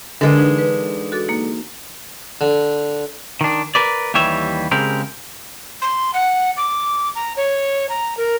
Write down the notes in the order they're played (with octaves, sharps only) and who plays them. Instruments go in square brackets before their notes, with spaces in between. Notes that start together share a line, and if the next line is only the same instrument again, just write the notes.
[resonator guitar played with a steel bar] D3 G#3 [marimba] A#4 B4
[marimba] E3 D#4 B4
B4
F#4 A4 D6
A#3 D#4
[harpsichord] D3
[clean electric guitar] D#3 D4
A#4 B4 D5
D#2 E3 G3 C#5 E5
C#3 G#3 C4 G4 A#4
[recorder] C6
F#5
D6
A#5
C#5
A#5
A#4